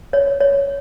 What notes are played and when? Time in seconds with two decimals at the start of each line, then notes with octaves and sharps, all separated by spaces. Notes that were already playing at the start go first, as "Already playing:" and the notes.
0.13 C#5
0.41 C#5